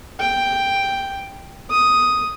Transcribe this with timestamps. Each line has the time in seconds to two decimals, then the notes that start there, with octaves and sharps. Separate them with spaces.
0.20 G5
1.70 D#6